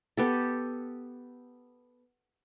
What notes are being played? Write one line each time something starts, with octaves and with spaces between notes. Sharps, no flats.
B3 G4 A4